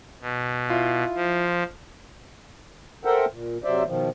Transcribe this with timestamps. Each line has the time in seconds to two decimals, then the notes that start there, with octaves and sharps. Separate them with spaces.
0.21 B2
0.70 E4 F4
1.16 F3
3.05 A4 A#4 C5 E5 F#5 G5
3.32 A#2
3.64 C3 F#3 C5 D5 E5
3.85 B2 D#3 F3